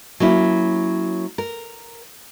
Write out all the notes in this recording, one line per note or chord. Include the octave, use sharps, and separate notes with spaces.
F#3 A#3 C#4 E4
A#4